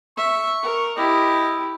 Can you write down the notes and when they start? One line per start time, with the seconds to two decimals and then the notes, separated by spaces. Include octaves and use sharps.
0.18 E5 C#6
0.63 A#4
0.97 E4 G4 D#5